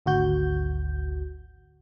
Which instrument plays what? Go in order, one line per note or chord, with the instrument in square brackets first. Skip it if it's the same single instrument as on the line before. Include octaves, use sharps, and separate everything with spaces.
[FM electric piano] G#1 D2 F#4 G6